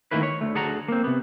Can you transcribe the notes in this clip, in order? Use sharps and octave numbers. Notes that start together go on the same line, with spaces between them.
D#3 A3 A#3 E4 B4
C#5
D2 A3
D2 G#4 A4 F#5 A#5
A#3 C4
C3 B3